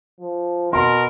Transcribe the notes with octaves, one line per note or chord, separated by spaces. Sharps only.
F3
B2 A#4 C6